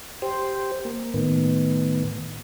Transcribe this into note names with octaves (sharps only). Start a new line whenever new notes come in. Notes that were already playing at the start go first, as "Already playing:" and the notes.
G4 C5
A#3
A2 D#3 B3